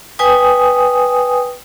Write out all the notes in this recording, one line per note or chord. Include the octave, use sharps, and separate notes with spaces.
B4 G5 G#5 D#6